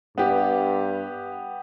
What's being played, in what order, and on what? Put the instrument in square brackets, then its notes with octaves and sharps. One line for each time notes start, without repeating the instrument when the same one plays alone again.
[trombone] G2 [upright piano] B3 G4